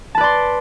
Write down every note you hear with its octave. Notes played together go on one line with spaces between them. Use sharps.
B4 D5 A5 C6